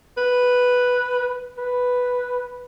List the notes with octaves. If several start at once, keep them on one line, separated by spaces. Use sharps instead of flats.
B4
B4